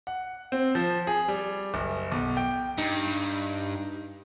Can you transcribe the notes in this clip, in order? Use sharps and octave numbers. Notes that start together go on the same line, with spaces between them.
F#5
C4
F3
G#4
G3
F#1
B1
G5
G2 D#4